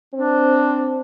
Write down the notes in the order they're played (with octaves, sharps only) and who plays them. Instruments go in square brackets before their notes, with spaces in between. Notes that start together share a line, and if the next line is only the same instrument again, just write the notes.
[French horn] C4 [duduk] D4